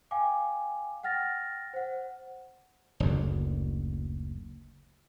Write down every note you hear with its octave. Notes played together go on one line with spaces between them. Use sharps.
F5 G5 G#5 D6
F#5 G5 F6 A6 A#6
C5 F#5
F#1 D2